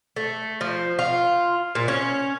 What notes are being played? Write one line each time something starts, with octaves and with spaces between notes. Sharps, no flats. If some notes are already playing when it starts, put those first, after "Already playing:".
A3
F3
F4
A#2
C#4